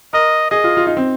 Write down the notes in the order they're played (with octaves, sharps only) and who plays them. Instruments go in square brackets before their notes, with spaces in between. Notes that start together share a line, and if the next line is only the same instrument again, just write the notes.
[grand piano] A#4 [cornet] D#5
[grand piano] G#4 [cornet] D#5
[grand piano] F4
F4
D#4
C4